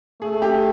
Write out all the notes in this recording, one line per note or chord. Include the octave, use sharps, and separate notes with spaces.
A3 G#4
G4